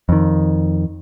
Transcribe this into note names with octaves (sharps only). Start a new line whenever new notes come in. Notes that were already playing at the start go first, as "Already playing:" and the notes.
F2 D#3